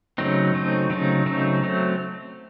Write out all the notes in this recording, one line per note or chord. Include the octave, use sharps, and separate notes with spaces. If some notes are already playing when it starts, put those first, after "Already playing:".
C#3 F#3 A3 C4 D#4
C#3 F#3 A3 C4 D#4
C#3 F#3 A3 C4 D#4
C#3 F#3 A3 C4 D#4
F#3 A3 C4